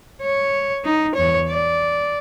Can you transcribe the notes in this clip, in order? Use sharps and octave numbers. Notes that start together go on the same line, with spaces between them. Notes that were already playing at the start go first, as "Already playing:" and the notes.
C#5
D#4
E2 C#5
D5